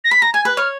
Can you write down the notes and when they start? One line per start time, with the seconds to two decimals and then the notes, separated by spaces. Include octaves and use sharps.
0.04 A#6
0.11 B5 B6
0.22 A#5 A#6
0.34 G#5 G#6
0.45 B4 F#6
0.57 C#5 F6